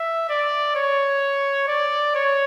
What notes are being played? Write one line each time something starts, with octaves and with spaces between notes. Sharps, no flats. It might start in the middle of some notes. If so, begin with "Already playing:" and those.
Already playing: E5
D5
C#5
D5
C#5